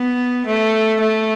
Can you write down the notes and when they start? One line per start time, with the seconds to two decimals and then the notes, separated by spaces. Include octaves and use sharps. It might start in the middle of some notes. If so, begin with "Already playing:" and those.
Already playing: B3
0.46 A3
1.01 A3